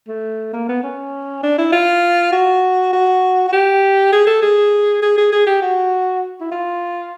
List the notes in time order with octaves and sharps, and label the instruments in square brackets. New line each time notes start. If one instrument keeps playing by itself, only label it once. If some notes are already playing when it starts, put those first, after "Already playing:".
[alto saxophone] A3
A#3
B3
C#4
D4
E4
F4
F#4
F#4
F#4
G4
G#4
A4
G#4
G#4
G#4
G#4
G4
F#4
E4
F4